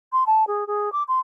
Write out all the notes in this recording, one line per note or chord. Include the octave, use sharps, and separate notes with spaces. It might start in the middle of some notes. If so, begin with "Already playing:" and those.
C6
A5
G#4
G#4
D6
C6